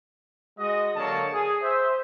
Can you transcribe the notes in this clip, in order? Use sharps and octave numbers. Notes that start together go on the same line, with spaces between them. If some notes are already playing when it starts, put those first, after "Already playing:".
G#3 F#4 D#5
D3 F#3 A#3 C#5 A5
G#4
C5 E5